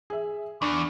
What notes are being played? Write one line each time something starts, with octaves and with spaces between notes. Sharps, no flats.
G#4 E5
E2 D4 C#6 D6